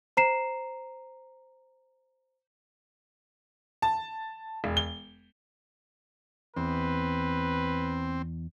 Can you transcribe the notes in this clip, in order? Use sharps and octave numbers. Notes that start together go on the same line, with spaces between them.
C5 A#5 C7 E7
A5
E1
G7
E2 C4 B4